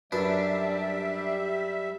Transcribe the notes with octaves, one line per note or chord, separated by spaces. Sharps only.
F#2 G3 D4 B4 E5